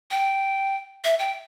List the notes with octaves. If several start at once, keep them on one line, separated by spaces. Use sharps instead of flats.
G5
E5
G5